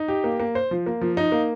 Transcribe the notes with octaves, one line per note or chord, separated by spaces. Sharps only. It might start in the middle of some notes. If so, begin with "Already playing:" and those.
Already playing: D#4
G4
A#3
A#3
C5
F3
A#3
F3
D#4
A#3